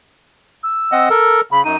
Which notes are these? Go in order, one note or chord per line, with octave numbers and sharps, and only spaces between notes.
E6
C4 D#5 F#5
A4 A#4
C#3 B5
F#2 D#4 D#7